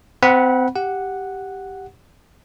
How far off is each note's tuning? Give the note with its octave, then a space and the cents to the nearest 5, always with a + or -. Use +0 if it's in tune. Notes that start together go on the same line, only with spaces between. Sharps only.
C4 -30 F#5 +0 B5 -20
G4 +0 F#5 +0